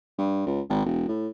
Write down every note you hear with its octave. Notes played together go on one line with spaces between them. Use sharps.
G2
C#2
G#1
E1
A2